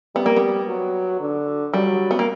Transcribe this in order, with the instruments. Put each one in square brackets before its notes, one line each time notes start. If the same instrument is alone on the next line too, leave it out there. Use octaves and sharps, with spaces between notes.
[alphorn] G3 [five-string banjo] B3
[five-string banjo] A#3
B3
[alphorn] F#3
D3
[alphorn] F#3 [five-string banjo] G3
[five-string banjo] B3
A#3